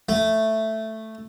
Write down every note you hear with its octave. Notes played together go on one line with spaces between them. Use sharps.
A3